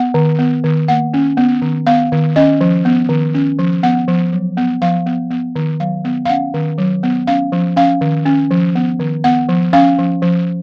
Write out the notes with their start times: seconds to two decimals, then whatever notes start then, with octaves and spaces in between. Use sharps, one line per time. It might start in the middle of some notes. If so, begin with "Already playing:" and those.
Already playing: B3 F#5
0.14 D#3
0.39 B3
0.64 D#3
0.88 A#3 F#5
1.14 C#4
1.37 B3
1.62 D#3
1.87 B3 F5
2.12 D#3
2.36 C#4 D#5
2.61 F3
2.85 B3
3.09 D#3
3.34 C#4
3.59 F3
3.83 B3 F#5
4.08 F3
4.33 F#3
4.57 B3
4.82 F3 F5
5.06 B3
5.31 B3
5.56 D#3
5.80 F#3 F5
6.05 B3
6.25 F5
6.29 C#4 F#5
6.54 D#3
6.78 F#3
7.03 B3
7.27 C#4 F5
7.52 F3
7.76 C#4 F5
8.01 D#3
8.26 C#4
8.51 F3
8.75 B3
9.00 D#3
9.24 B3 F#5
9.49 F3
9.73 C#4 F5
9.98 F3
10.22 F3